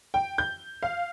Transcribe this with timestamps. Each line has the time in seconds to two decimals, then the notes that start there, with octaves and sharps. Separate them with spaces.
0.14 G5
0.38 G6
0.83 F5